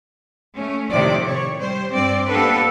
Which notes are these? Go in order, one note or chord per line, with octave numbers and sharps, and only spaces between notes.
A3 C#4
A2 C3 D#3 F3 D5
C#5
G3 C5
G2 C4 D5
A#3 B3 D4 G4 A4 B4